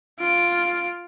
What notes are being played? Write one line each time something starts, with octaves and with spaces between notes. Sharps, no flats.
F4 D7